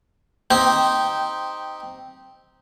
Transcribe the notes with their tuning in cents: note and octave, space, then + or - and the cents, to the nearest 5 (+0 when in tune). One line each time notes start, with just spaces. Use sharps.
C4 +0 D#4 +0 G4 -10